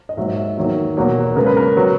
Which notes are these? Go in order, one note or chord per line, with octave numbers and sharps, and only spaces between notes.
D#5
G#2 F#3 A#3 E5
E5
E2 D#3 F#3 A#3
E2 B2 F#3 A#3
C#3 G#3 B3 A#4
B4
A#4
F#3 B3